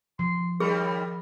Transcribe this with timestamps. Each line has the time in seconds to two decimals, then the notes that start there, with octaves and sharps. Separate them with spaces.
0.19 F3 C6
0.60 D#2 G3 G#4 A#4